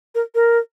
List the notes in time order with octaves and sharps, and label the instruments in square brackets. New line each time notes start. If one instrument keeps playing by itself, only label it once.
[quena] A#4
A#4